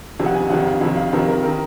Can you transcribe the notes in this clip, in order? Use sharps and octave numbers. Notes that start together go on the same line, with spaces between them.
F2 C3 D#3
F#5
G#5
F2 C3 D#3 F#5
F#5
F5
F2 C3 D#3
F5
F2 C3 D#3 A#4
A#4
D#3 A#4